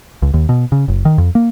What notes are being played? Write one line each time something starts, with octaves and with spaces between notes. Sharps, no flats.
C#2
D#2
B2
C#3
F#1
D#3
F2
A#3